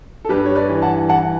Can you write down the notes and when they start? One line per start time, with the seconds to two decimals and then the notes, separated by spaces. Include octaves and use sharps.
0.25 A4
0.29 G2 G4 B4
0.46 C#5
0.56 B4 D5
0.69 E3
0.82 F#5 A5
1.09 E3 F#5 A5